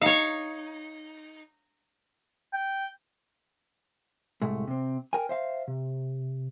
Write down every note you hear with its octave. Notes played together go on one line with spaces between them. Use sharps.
D#4 C#5 F5
G5
C2 A2 G#3 A3
C3 C4
A#4 G5 G#5
C5 E5 F5
C3